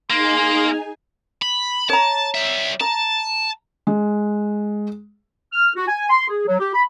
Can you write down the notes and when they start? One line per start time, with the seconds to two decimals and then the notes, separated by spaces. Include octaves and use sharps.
0.10 A#3 D#4 G#4 G#5 C6
1.42 B5
1.90 C#5 A5 A#5
2.35 G3 E5
2.81 A5 A#5
3.87 G#3
5.53 F6
5.76 F#4
5.88 G#5
6.10 C6
6.29 G#4
6.47 F#3
6.59 G4
6.74 B5